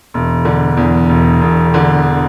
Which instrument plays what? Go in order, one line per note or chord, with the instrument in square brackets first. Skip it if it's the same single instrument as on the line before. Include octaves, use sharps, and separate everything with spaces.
[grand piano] E1
D3
E2
E1
E1
D3